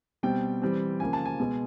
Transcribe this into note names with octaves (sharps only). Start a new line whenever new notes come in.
B2 G3 C4 G5
E3 G3 C4
C#3 F3 A#3 G#5
A5
G#5
B2 G#3 B3